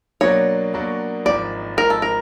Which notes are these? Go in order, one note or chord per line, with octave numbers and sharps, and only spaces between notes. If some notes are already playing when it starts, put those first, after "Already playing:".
B2 F#3 A#3 D4 C#5
B2 F#3 A#3 D4
G#1 G#2 F3 D5
G#1 G#2 F3 A#4
A4
A#4